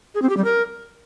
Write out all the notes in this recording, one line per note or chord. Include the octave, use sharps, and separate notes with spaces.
G#4
C4
G4
G3
A#4